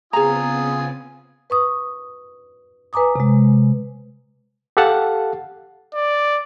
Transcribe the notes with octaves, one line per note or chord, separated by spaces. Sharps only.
C#3 B3 C4 F4 G#4 G#5 A#5 D#6
B4 C#6 D#6
B4 G#5 A#5 D6 D#6
C3 G#3
G4 A4 F5 F#5 A5
D5